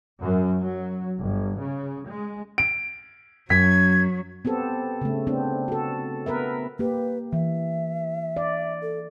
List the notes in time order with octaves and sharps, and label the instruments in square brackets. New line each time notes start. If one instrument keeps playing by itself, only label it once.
[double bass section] F#2
F#3
G1
C#3
G#3
[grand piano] D7
[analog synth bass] F#2 [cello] F#3 [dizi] G#6 [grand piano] B6
[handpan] B3 C4 G4 A4
C#3 A3
B3 C4 D4
F#4 A4
B3 A#4 B4 E5
[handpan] A#3 G4 [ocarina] B4
[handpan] E3 [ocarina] E5
[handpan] D5
[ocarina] A4